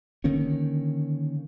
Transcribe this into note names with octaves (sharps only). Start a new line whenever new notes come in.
D3 D#3 A#3 C#4